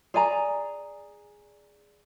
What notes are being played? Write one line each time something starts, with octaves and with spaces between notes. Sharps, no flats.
G#4 D5 G#5 A#5